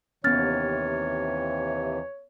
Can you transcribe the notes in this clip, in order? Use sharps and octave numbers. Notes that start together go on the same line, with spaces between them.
D#2 C3 E3 B3 C#4 C#5 F6 A6